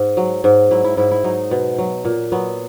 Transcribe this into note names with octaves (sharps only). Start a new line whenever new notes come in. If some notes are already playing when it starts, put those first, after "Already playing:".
Already playing: G#2
F#3
G#2
F#3 E4
E4
G#2 E4
E4
F#3 D#4
B2
F#3
A#2
F#3 B3